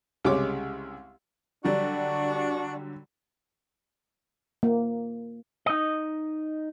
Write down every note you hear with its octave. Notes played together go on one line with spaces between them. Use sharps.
C2 C#3 G#3 G4 C#5 D6
D3 F#3 G3 D4 F#4
A#3
D#4 D#5